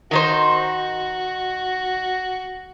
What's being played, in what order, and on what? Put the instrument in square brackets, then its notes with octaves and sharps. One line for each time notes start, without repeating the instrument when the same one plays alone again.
[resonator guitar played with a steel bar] D#3 D#4 C5 [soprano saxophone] F#4